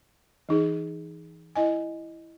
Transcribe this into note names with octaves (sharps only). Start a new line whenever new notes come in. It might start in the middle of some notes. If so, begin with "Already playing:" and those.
E3 D#4 G#4
E4 D#5 G#5